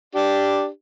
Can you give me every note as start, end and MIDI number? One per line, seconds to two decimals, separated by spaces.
0.15 0.68 62
0.15 0.68 67